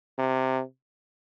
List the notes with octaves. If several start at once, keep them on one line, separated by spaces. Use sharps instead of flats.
C3